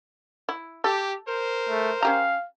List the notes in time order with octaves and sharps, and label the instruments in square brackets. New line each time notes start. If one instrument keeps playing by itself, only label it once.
[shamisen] E4
[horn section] G4 [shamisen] A4
[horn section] A#4 C5
[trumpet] A3
[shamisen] C#4 G4 A#5 [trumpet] F5